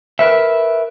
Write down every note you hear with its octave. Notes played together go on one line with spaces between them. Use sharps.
A#4 B4 E5